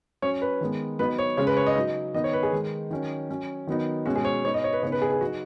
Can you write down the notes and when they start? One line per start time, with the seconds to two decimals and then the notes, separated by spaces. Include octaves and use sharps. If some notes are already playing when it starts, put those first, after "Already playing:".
0.22 F#3 C#4 C#5
0.42 B4
0.61 D#3 G#3 B3
0.99 F#3 B3 D#4 B4
1.18 C#5
1.37 C#3 G#3 C#4 C#5
1.47 B4
1.57 C#5
1.66 D#5
1.76 F#3 D#4
2.14 D#3 B3 D#4 D#5
2.24 C#5
2.33 B4
2.43 G#4
2.52 D#3 G#3 D#4
2.91 D#3 F#3 C#4
3.29 F#3 C#4
3.67 D#3 F#3 B3 D#4
4.06 B2 G#3 C#4 F#4
4.16 G#4
4.25 C#5
4.44 B2 B3 D#4 C#5
4.54 D#5
4.64 C#5
4.73 B4
4.83 C#3 B3 D#4 C#5
4.92 B4
5.02 G#4
5.12 G#4
5.21 F#3 D#4 F#4